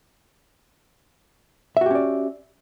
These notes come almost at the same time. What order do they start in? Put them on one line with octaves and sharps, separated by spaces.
E5 F#4 G4 C#4 D5